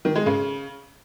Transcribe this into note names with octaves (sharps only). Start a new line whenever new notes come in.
D#3
G#3
C#3